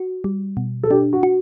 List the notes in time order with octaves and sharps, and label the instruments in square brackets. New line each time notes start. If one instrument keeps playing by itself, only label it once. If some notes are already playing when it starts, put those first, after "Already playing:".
Already playing: [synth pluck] F#4
G3
B2
[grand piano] A4
[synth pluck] D4 [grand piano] G4
[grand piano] F#4
[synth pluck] F#4